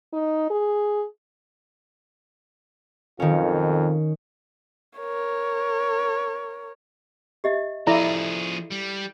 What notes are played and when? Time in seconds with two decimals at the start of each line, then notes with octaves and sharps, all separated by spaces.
0.13 D#4
0.50 G#4
3.20 B1 F2 D#3 C#4 F4
4.99 A#4 C#5
7.44 G4 D#5 E5
7.87 F3 E4 G#4 A4 D5 F5 A#5
8.72 G3